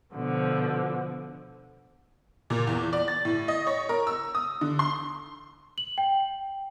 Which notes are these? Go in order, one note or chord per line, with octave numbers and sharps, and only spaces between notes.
B2 D3 F3
A#2
E2
D5
A6
A2
D#5
C#5
A#4
E6
D#6
D3
C6
F#7
G5